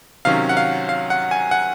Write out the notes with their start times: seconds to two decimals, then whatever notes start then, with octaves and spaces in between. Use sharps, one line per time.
0.25 C3 D#3 F#3 C#4 F5
0.49 F#5
0.57 F5
0.89 F5
1.10 F#5
1.31 G#5
1.51 F#5